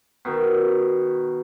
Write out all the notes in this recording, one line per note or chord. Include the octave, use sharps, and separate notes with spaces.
B2 D#3